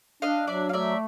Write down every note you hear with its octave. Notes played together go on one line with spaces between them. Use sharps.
D4 D#5 F5
F#3 D5 E5
F5
A3 D5 E5